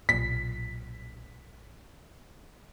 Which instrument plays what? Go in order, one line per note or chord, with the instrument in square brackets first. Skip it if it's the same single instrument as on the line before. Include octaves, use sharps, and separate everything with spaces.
[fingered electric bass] B1 A#2 [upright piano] B6